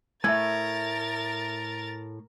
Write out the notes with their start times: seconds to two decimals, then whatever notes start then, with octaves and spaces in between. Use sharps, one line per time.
0.24 A2 A3 A#4 E5 G#5 G#6 A6